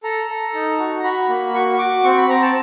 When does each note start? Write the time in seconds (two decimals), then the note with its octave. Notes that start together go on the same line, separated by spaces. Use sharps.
0.03 A4 A#5
0.28 A4
0.54 D#4
0.79 F#4
1.03 F#4 B5
1.29 A#3
1.54 F#4 C#6
1.78 F#4 D6
2.04 C4 C#6
2.17 B5
2.29 C4 A#5
2.42 A5